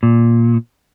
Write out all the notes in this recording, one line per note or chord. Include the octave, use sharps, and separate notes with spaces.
A#2